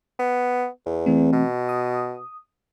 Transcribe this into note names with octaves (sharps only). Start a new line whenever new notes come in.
B3
E2
E3 A3 C4
B2
D#6